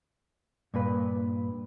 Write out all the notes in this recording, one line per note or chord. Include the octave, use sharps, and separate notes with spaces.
G2 A#2 B4